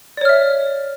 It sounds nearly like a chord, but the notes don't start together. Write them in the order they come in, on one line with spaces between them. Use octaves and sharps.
D5 C#5 F6 E5